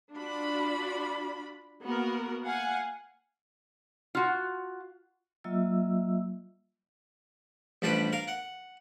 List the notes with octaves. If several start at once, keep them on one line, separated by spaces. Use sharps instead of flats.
D4 F4 F#4 D5 B5
A#3 B3 F#4 A#4
F5 F#5 G#5
F4 F#4
F#3 A#3 F4 D#5 E5 E6
A1 F3 G3 D4 B4
A#4 F5
F#5